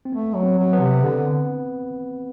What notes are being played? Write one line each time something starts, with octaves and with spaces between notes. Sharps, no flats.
C4
A3 B3
F#3
C4
F#3
B3
C3
D3